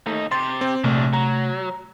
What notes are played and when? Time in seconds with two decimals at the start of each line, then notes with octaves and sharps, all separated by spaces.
0.07 D#2 A3 D#4
0.31 C3 G4 C6 A6
0.61 C4
0.84 A#1 C3 F#3 A3 D4
1.14 F#3 A#5